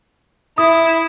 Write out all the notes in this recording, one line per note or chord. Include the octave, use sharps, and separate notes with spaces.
E4 D#6